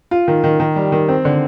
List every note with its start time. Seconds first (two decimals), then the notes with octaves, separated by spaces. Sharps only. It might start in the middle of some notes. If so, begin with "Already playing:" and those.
0.11 F4
0.28 D#3
0.44 D#3
0.60 D#3
0.76 G3
0.92 D#3
1.09 C4
1.25 D3